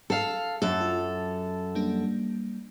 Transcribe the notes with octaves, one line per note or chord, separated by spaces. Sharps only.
A4 F5
F#2 A4
F4
G3 A#3 D4